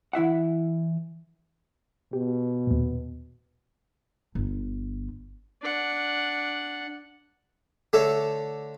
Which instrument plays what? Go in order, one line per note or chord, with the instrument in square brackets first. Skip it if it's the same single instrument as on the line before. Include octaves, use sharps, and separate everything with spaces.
[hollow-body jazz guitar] E3 E4 E5 F#5
[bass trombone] B2 [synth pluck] G4
[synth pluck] D#2 A#2
[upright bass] G1
[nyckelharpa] D4 F#5
[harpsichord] D3 A3 A4 C#5 E5